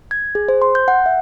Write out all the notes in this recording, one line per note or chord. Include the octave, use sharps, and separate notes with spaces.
G#6
G#4
C5
C6
G6
F#5
E5